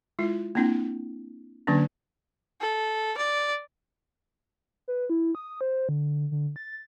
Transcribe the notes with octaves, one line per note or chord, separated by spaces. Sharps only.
G#3 E4 F4
A#3 C4 D4 E4
D3 F#3 A#3 C#4 D4
A4
D5
B4
E4
D#6
C5
D3
D3
A6